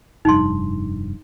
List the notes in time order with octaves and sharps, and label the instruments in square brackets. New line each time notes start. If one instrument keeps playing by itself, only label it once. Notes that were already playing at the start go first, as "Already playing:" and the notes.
[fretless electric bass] F1 G2 [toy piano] D#4 C6